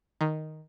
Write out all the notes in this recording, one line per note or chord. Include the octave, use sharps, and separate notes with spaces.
D#3